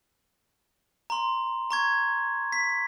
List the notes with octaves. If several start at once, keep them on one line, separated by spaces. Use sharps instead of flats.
A#5 C6
A#5 C#6 G#6
B6